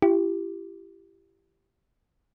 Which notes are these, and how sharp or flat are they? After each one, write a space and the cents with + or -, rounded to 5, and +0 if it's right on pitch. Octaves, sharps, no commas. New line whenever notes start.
E4 +40 G4 +0